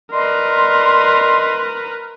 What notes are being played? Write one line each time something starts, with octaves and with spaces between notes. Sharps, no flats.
A#4 B4 D5 D#5 C6